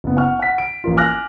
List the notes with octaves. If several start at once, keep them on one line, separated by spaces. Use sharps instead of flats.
F#1 B3
F#5 C#6 F6
F#5 B6
D7
A1 A#3 F4
G#5 D6 F6 F#6 A#6